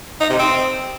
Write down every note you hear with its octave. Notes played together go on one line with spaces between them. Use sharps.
D#4
C3
C4